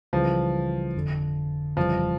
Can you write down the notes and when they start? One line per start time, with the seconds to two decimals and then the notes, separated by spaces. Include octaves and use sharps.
0.13 C#2 C#3 E3 F3 G3
0.94 G1 F2 D3
1.76 G1 F2 C#3 E3 F3 G3